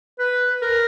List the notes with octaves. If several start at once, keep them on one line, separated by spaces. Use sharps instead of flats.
B4
A#4